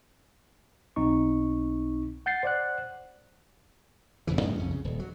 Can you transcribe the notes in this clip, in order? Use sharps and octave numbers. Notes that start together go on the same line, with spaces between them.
B1 C4 D#4 C#6
F#5 G6 A6 C7
C5 D5 F#5 F#6
F1 F2 C#3 E3
F#2 A2 C#3 F3
C2 F2 C#4
C#3
D#1
F#3